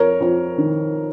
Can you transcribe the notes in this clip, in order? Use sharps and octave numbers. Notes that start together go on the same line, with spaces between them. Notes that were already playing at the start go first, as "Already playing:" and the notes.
Already playing: F2 A#4 C#5
F2
D#3